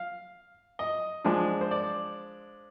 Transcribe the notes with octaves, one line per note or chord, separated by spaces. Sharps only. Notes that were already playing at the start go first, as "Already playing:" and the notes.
Already playing: F5
D#5
F3 G#3 D4
C5
D5